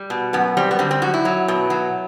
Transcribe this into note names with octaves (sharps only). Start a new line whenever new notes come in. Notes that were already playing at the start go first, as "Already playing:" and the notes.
Already playing: G3
B2
F#2 B3
G3 C4
B3
D3 C4
C4
F#2 F#4
E4
F#3
B2
F#3